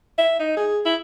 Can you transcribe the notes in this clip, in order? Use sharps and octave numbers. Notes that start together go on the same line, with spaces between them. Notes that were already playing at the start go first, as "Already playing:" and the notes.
E5
D#4
G#4
E4